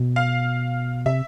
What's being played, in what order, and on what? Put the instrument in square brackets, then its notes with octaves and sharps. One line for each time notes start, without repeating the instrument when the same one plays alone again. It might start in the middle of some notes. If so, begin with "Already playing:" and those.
Already playing: [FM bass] B2
[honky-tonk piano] F5
[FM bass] C3 [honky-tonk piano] E5